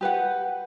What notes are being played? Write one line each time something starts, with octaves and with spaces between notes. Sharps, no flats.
G4 B4 F#5